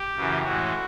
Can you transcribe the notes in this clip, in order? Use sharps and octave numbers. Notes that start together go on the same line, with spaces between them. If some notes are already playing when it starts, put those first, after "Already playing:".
Already playing: G4
F#2 C#3 E3
A2 E3 G#3 F#4